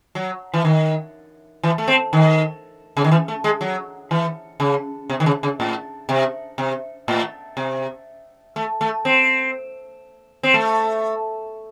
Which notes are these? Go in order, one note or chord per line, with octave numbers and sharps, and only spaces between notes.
F#3
E3
D#3
E3
A3
C4
D#3
C#3
D#3
E3
A3
G#3
F#3
E3
C#3
C3
D#3
C#3
C#3
A2
C3
C3
A2
C3
A3
A3
C4
C4
A3